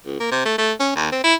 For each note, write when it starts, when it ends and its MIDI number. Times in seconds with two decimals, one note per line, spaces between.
0.06 0.16 37
0.20 0.31 58
0.31 0.43 48
0.45 0.55 57
0.58 0.72 57
0.80 0.91 61
0.96 1.11 39
1.12 1.21 60
1.24 1.34 64